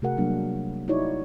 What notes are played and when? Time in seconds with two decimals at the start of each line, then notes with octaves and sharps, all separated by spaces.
0.02 C3 A3 F#4 G#4 A#4 F#5
0.17 F#3 G3 A#3 D4
0.88 D#4 E4 F#4 C#5 D5